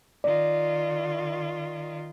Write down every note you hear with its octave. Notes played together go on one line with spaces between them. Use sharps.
D#3 F4 D5